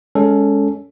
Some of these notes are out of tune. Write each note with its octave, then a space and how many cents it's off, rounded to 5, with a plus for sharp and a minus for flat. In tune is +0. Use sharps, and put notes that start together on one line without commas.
G#3 +0 C#4 +20 A4 +5